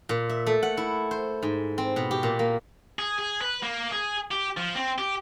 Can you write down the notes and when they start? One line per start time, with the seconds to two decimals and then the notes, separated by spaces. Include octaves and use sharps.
0.09 A#2
0.29 E5
0.46 A3
0.63 F#5
0.77 E4
1.11 C5
1.43 G#2
1.78 C4
1.96 B2
2.11 G4
2.23 A#2
2.39 A#3
2.99 G#4
3.19 G#4
3.41 B4
3.62 A#3
3.92 G#4
4.31 G4
4.57 F3
4.76 C4
4.98 G4